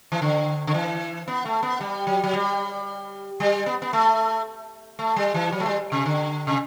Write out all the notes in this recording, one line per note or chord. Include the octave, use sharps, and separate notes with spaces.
E3
D3
D3
E3
B3
A3
B3
G3
F#3
F#3
G3
G3
B3
B3
A3
A3
G3
E3
F#3
A3
G3
C3
D3
C3